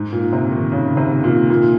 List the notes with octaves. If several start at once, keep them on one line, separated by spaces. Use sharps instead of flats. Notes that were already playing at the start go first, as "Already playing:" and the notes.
Already playing: G#2
A#2
C3
D#3
C#3
C3
A#2
A#2